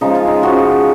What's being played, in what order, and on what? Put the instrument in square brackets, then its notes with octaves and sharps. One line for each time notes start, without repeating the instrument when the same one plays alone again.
[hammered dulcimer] C#3 F3 G#3 D#4
F4
D#4
C#3 F3 G#3 F#4